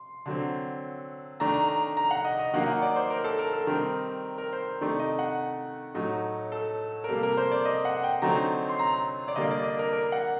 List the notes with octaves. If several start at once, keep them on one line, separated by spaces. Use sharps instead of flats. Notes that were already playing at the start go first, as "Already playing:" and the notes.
Already playing: C6
D3 F#3 C4
D#3 A3 D4 A#5
A#5
A#5
A#5
F#5
D#5
D#5
D#3 F#3 A#3 D#4 F#5
F#5
D5
C5
A#4
A4
A#4
A4
D#3 G3 C4 D#4 A#4
A#4
C5
C3 D#3 A3 D#4 D5
D#5
F#5
A2 F#3 A3 D#4
A4
A#4
C3 G3 A#3 A4
A#4
C5
D5
D#5
F#5
G5
D3 F#3 A3 C4 D#4 A#5
C6
A#5
D5
D3 G3 A#3 D4 D#5
D5
D#5
A#4
A#4
F#5